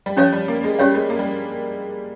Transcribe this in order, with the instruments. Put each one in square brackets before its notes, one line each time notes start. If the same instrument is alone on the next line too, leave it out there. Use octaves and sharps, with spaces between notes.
[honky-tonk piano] G3
[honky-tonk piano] F3 [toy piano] C#4 G4 C#5 F5
[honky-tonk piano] G3
A#3
G#3
[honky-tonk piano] G3 [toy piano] C#4 G4 C#5 F5
[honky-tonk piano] G#3
A#3
G3